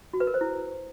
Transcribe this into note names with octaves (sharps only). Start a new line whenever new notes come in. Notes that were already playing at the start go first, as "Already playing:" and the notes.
F#4
B4
A#4
C5
E4